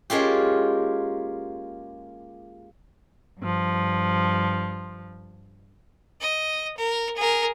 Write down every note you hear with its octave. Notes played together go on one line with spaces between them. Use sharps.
G#3 A#3 C#4 F4 G4
G2 F3
D#5
A#4
G#4 A#4